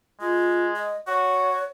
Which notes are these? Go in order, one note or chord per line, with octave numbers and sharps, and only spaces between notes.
G#3 F4
D#5
F#4 C#5